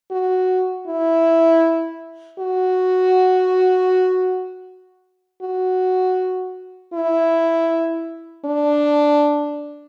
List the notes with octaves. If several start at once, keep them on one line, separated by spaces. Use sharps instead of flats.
F#4
E4
F#4
F#4
E4
D4